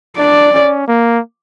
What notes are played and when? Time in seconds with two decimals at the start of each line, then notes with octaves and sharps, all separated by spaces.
0.18 D4 D5
0.53 C#4
0.88 A#3